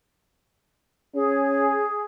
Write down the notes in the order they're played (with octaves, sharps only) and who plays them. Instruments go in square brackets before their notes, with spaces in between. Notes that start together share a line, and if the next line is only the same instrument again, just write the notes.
[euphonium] C#4 [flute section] G#4